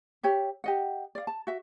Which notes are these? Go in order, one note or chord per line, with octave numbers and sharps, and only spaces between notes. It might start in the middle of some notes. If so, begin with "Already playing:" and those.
G4 C#5 E5
G4 D#5 F#5
D5 F5
A5
F#4 E5